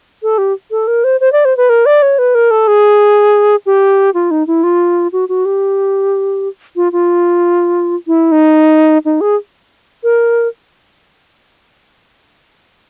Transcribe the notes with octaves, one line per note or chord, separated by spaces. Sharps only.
A4
G4
A4
A#4
C5
C5
D5
C5
B4
A#4
D5
C#5
B4
A#4
A4
G#4
G4
F4
D#4
E4
F4
F#4
F#4
G4
F4
F4
E4
D#4
D#4
G#4
A#4